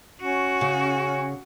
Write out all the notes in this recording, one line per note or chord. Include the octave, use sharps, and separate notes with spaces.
C#4 F#4
C#3 G#4